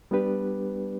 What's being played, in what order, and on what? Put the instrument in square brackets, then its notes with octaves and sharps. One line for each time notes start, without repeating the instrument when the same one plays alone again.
[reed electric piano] G3 B3 D4 G4 B4